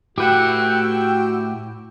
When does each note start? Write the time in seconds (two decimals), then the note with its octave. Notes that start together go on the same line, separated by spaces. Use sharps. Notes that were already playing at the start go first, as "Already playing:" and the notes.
0.18 A2 E4 F#4 G4 B4 F#5 G5 E6